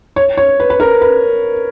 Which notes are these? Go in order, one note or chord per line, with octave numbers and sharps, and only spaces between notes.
C#5
C#5
B4
B4
A#4
B4